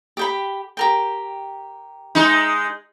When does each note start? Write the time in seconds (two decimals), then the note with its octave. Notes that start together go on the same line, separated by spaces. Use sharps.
0.17 G4 G5 B5
0.77 G4 A#4 G5
2.15 G#3 D#4